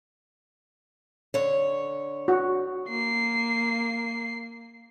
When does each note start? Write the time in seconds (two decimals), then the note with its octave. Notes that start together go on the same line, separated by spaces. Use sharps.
1.34 D3 C#5
2.28 F#4
2.89 A#3 C7